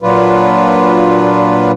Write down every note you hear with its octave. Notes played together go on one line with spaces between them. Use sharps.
A#2 F#3 D4 F4 B4